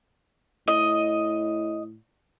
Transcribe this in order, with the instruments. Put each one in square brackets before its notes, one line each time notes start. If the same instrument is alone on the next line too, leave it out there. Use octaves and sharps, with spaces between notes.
[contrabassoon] A2 [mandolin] D#5